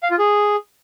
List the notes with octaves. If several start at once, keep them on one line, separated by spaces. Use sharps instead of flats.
F5
F4
G#4